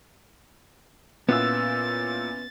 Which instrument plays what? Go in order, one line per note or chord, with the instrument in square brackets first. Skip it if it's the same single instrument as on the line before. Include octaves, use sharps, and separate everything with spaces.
[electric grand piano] A#2 E6 [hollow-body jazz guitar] B3 [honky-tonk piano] C#4 E4 F4 [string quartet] A6